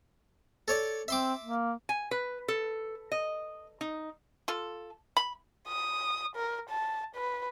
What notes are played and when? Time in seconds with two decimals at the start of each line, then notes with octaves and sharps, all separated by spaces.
0.68 A4 C#5 D5
1.08 C4 E5 C6 D6
1.44 A#3
1.89 G#5
2.11 B4
2.48 A4
3.12 D#5
3.81 D#4
4.48 F4 A4
5.17 B5
5.68 D#6
6.36 A#4
6.70 A5
7.15 B4